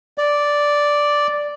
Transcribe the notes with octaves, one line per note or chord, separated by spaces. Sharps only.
D5